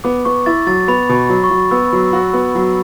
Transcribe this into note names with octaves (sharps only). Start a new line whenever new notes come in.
B3 D6
B3 C#6
E4 A6
F#3 A6
B3 B5
B2
B5
F#3
C#6
F#3
B3 E6
F#3
F#4
B3
F#3